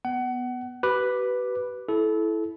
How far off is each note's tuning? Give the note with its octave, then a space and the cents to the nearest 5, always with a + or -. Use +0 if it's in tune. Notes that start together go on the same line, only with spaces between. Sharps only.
B3 +0 F#5 +25
G4 -45 B4 +0 D6 +5
E4 +0 A4 -25